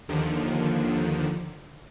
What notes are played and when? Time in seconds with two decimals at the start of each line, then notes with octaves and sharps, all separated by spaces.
0.08 D#2 D3 D#3 F3